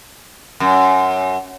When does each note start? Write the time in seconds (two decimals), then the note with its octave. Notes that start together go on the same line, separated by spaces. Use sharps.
0.60 F#2